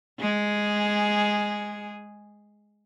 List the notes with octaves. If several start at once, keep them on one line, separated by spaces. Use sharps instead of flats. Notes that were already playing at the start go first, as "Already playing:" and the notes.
G#3 G#4